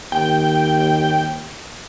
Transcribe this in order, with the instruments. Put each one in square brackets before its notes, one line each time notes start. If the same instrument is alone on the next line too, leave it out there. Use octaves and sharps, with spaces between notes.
[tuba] D#2 [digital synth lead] G5